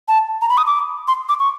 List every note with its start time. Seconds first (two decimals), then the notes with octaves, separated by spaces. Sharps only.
0.08 A5
0.42 A#5
0.49 B5
0.57 D#6
0.67 D6
1.08 C6
1.29 D6
1.39 C#6